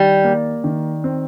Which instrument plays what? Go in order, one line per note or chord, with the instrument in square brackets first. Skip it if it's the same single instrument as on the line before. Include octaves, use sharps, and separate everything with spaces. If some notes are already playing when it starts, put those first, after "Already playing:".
Already playing: [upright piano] D#3 [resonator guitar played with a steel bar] G3
[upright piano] A#3
D#3
C4